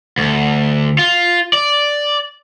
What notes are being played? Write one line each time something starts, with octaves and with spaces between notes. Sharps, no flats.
D2
F4
D5